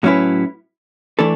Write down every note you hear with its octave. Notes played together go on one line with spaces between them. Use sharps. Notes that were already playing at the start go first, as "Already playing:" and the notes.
A2 F#3 C#4 E4 B4
E3 A3 D4 A4